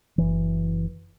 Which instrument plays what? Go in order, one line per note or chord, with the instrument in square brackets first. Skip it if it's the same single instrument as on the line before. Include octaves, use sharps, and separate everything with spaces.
[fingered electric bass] F#1 E3